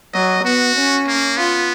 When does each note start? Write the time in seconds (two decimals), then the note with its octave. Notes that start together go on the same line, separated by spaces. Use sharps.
0.14 F#3 D#5
0.44 B3 F#4
0.76 C#4
1.07 A#3
1.37 B3 F4